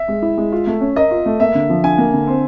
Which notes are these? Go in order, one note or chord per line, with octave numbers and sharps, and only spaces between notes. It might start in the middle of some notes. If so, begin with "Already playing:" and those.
Already playing: E5
G#3
E4
G#3
F4
A3
C#4
A#4 D#5
F4
A3
A#3 E5
D3
F3
D3 G#5
A#3
D3
C4